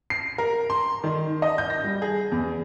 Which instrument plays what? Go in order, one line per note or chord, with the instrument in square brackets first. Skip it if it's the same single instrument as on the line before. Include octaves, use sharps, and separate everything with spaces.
[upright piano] C7
A#4
C6
D#3
D#5
G6
A#6
G3
G#4
E2